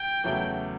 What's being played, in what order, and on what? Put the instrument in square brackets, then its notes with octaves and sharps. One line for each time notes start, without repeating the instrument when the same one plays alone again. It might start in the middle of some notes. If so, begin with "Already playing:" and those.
Already playing: [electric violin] G5
[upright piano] E2 C#3 F#3 A3